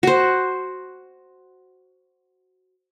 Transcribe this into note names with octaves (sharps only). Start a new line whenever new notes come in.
F#4 C5